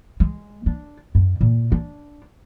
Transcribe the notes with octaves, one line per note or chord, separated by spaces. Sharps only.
G#3
D4
F#2
A#2
D4